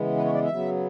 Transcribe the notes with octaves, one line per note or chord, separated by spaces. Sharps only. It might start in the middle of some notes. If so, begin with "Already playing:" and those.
Already playing: C#3 E3 G#3 B3
B4
C#5
D5
E5
C#3 F#3 B3